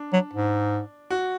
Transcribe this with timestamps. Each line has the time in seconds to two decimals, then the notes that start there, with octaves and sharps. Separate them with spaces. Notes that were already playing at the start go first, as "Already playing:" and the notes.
Already playing: D4
0.13 F#3
0.33 G#2
1.10 F#4